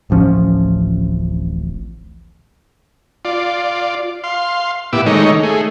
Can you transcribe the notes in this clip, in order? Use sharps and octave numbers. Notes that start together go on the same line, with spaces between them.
D1 A1 F3 C#4
F4 D5
F5 C6
A#2 B3 E4 G4 D6 E6
D#3 G#3 A3 D#4 C#5 D#5
A3 G#4